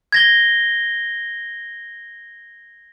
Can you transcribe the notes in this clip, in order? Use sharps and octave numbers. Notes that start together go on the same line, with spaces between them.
G#6 A#6 G7